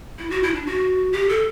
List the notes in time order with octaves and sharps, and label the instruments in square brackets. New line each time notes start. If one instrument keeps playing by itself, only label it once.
[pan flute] E4
F#4
E4
D4
F#4
G4
A4